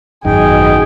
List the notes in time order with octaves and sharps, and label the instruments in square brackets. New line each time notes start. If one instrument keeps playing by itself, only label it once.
[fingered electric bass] G#1 F#2 [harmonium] B2 G5 [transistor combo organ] D#4 [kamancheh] G#4